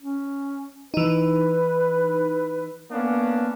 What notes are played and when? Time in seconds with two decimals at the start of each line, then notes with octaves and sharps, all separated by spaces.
0.02 C#4
0.94 E3 D#4 B4
2.91 A#3 B3 C#4 D4